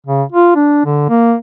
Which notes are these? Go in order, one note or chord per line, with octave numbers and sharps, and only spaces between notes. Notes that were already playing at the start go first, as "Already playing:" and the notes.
C#3
F4
D4
D3
A#3